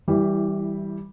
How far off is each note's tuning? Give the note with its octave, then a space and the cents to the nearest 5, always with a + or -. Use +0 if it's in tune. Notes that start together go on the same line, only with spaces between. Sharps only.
E3 -20 G3 +0 E4 +0